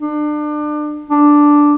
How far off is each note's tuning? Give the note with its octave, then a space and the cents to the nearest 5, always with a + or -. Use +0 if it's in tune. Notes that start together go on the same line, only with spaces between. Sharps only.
D4 +30
D4 +0